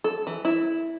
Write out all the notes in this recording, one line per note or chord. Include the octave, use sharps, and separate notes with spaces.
A4
E3
E4